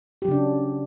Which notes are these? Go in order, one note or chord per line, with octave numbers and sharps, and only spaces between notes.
C#3 F#3 D4 G4